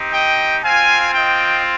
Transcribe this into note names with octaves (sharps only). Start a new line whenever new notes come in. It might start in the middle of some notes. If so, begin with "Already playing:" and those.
Already playing: C4 D#4 G4
D#5 G5
C4 F4 F5 G#5
D#5 G5